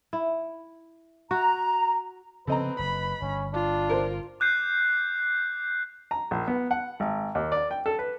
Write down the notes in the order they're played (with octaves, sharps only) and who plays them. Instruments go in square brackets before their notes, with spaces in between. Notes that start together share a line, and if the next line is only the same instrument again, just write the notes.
[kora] E4
[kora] F#4 [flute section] A#5
[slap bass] C#3 F3 B3 [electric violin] C4 [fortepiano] A4 D#5 A#5 [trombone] B4
[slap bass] F#1 [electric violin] B5
[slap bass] G1 [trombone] C#4
[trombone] D4 [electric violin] F4
[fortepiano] A#4 C5
[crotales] D6 F#6 G6 C7
[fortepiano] A#5
A#1
B3
F#5
G#1
D#2
D5
G5
A4
B4